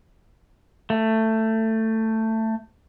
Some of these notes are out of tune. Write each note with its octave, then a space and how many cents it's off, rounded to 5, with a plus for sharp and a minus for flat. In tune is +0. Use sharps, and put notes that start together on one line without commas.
A3 +15